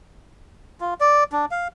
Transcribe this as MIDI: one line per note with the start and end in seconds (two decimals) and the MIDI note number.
0.81 0.94 65
1.00 1.24 74
1.32 1.45 62
1.51 1.68 77